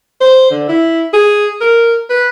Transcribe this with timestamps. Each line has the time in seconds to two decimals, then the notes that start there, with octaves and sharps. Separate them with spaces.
0.20 C5
0.50 D3
0.69 E4
1.13 G#4
1.61 A#4
2.09 B4